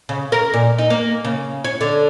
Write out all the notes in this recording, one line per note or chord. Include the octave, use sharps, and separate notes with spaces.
C#3
A#4
A#2
D#4
A#3
C#3
C#5
D3